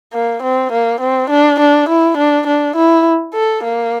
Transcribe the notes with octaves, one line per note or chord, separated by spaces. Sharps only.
A#3
C4
A#3
C4
D4
D4
E4
D4
D4
E4
A4
A#3